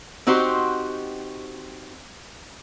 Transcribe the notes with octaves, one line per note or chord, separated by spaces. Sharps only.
C4 D#4 F#4 G4 C5